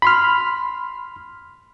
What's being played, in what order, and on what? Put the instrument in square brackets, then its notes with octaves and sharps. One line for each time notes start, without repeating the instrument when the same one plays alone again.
[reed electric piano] B5 C6 F6